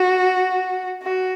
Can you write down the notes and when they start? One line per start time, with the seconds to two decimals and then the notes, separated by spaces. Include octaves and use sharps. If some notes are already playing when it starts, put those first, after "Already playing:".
Already playing: F#4
1.03 F#4